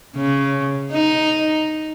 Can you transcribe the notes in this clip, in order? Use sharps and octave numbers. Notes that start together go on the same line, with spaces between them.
C#3
D#4